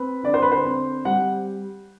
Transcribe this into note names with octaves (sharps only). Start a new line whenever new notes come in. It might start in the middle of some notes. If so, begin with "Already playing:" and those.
Already playing: C4 B4
D3 D5
C5
B4
C5
C4
G3 F#5